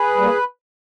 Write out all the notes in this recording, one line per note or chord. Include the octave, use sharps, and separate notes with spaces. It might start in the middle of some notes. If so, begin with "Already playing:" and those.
Already playing: G#4 B4
G3 A#3